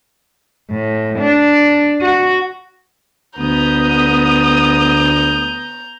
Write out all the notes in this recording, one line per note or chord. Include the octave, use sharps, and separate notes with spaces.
A2
D4
F#4
D2 B3 A#5 D#6 G6